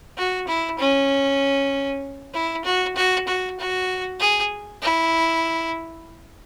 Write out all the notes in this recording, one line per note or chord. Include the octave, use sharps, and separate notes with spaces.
F#4
E4
C#4
E4
F#4
F#4
F#4
F#4
G#4
E4